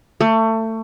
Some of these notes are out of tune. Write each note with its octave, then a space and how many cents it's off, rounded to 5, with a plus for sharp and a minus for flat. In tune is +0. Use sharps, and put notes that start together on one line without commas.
A3 +25